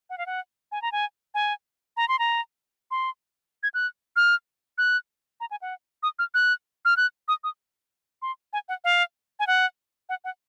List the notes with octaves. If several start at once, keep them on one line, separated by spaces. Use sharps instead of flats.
F#5
F5
F#5
G#5
A#5
G#5
G#5
A#5
C6
A#5
C6
G#6
F#6
F6
F#6
A#5
G#5
F#5
D#6
F6
F#6
F6
F#6
D#6
D#6
C6
G#5
F#5
F5
G#5
F#5
F#5
F#5